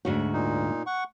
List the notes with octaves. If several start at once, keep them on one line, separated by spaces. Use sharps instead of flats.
D2 G#2 F#4
A#2 D#4
F#5 C#6